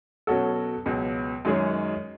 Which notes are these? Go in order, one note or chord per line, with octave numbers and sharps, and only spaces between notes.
B2 F#3 C#4 F#4 A4
C#2 B2 F#3
F#2 D#3 G#3 C#4 G#4